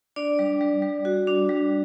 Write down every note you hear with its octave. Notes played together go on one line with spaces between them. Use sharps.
D4 D5
G3
G3
G3
F#4
D4
G3